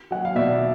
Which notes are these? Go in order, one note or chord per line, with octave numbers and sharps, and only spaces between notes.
F#3 F#5
F5
B2 D5 E5